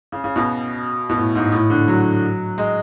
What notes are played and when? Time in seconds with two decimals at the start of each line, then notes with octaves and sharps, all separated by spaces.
0.12 C#3
0.24 C#3
0.36 B2
1.09 B2
1.17 A2
1.35 G#2
1.52 A2
1.70 D3
1.88 F#3
2.58 G#3